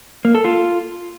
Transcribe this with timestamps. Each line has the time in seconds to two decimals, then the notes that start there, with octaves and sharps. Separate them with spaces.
0.25 A#3
0.35 A4
0.44 F4